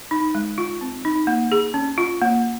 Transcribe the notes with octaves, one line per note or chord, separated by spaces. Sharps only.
D#4
G#3
F4
C4
D#4
A#3
G#4
C#4
F4
A#3